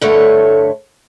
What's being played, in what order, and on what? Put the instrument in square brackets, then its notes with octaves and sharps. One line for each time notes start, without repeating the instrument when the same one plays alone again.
[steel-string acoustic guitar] G2 D3 A3 C#5